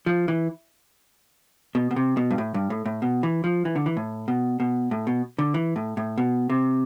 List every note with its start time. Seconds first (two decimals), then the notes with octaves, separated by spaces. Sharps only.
0.06 F3
0.28 E3
1.75 B2
1.91 B2
1.96 C3
2.17 B2
2.31 G2
2.38 A2
2.54 G2
2.70 A2
2.86 A2
3.02 B2
3.23 E3
3.44 F3
3.65 E3
3.76 D3
3.86 E3
3.97 A2
4.28 B2
4.60 B2
4.91 A2
5.07 B2
5.39 D3
5.54 E3
5.76 A2
5.97 A2
6.18 B2
6.50 C3